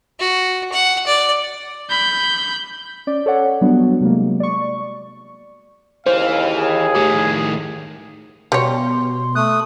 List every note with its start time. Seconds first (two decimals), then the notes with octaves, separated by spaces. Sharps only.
0.19 F#4
0.72 F#5
1.07 D5
1.90 B5 G6
3.07 C#4 D5
3.26 A4 C#5 D5 F#5
3.61 F#3 G3 B3 D4 F#4
4.01 C3 F#3 G#3 A#3
4.40 D5 C#6
6.06 D#2 C#3 E3 C5 F5
6.56 G#4
6.95 A2 D#3 G4
8.52 B2 G3 C#5 C6
9.35 A3 D#6 F#6